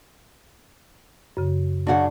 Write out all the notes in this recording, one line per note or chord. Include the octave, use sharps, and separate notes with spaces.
F#2 C#3
F#2 C#3 D4 F#4 F#5